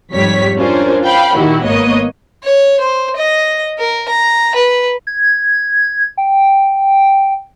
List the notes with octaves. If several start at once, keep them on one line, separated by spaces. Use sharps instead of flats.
F2 G#2 G3 C#5 B6
C#4 D4 F4 A#4 C5 C#5
F5 G5 B5
A#2 D#3 E4 F#4 G4
G#1 A#3 B3 C#5 D#5 D#6
C#5
C5
D#5
A#4
A#5
B4
G#6
G5